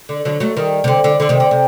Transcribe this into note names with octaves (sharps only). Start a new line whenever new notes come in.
D3
D3 F#3
F#3 A3
D#3 G3
C3
D3
D3
D3
C3 D#3
D3
C3